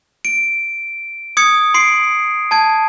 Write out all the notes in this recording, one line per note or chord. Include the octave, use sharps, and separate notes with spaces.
D7
D#6 G#6 C#7
C6 C7 D7
A5 G#6